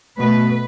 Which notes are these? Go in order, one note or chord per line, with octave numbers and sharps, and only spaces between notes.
B2 A3 B4